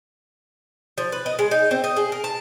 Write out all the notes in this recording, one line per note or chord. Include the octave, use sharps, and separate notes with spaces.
F3
B4
D#5
G#3
D#4
C4
D#5
G#4
A#4
A5